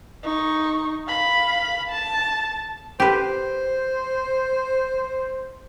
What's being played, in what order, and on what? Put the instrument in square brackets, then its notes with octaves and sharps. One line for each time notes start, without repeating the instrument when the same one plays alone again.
[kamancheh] D#4 C#6
F5 B5
A5
[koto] G4 B4 [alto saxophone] C5